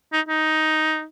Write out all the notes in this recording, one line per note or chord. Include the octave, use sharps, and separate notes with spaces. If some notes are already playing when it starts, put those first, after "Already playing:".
D#4
D#4